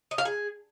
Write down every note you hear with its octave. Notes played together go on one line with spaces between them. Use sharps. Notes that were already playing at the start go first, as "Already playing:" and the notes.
D#5
F5
G#4